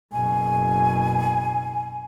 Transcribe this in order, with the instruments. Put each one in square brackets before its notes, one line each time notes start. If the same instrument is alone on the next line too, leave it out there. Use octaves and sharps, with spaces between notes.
[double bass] F#1 B2 [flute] G#5